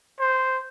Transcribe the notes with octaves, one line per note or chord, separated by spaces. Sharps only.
C5